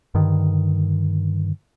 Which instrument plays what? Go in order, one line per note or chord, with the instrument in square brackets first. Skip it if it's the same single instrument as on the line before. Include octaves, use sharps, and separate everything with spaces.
[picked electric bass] G2 D3 D#3